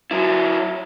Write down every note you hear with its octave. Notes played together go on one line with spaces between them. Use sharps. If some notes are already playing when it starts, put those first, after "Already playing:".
F#3 E4